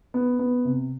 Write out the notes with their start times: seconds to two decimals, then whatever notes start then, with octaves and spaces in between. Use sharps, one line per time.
0.14 B3
0.39 B3
0.65 C3